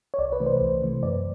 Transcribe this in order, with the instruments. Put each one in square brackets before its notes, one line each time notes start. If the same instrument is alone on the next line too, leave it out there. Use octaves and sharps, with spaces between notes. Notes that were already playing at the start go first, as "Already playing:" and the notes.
[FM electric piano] C#5
C2 D5
B4
C3 E3 A3
C5
C2
C3 E3 A3
F#2 D5